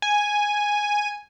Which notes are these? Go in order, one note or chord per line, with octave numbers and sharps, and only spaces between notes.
G#5